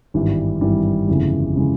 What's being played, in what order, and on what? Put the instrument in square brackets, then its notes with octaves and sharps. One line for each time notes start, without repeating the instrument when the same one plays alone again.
[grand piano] G#1 G2 E3 G3
G#1 G2 E3 G3
G1 F2 C#3 E3 G#3
C#3 E3 G#3